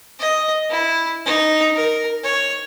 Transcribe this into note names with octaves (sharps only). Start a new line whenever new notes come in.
D#5
E4
D#4
A#4
C#5